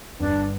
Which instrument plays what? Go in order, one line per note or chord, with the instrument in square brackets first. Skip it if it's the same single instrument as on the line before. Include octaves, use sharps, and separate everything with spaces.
[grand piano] G1 [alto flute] D4